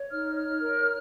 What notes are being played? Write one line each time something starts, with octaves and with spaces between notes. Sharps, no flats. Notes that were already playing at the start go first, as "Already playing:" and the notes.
Already playing: C#5
D#4 F6
C#5 F6
A#4